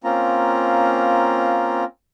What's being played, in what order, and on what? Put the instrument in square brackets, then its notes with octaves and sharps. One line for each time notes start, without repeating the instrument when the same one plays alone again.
[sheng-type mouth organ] A#3 C4 C#4 F4 A#5